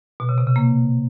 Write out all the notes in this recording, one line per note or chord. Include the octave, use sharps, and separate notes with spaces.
B2
C#3
C3
C#3
A#3